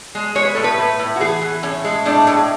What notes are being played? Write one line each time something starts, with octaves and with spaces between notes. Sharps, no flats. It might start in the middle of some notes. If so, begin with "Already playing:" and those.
G#3
G#3 C#5
B4
A2 A4
B4
A2
A2
F#4
E3 G#4
E3
A2 C#4
G#3
A2 D4
A2